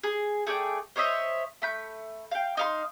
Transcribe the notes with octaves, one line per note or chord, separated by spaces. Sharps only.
G#4
A3 G#4 D5 G5
C5 C#5 D#5 E5
A3 B5 G6
F5 G5
D#4 F5 C6